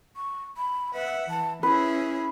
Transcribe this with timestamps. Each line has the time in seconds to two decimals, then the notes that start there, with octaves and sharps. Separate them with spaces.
0.16 C#6
0.57 B5
0.93 B4 E5 F#5
1.30 E3 A5
1.63 C#4 E4 G#4 B4 E5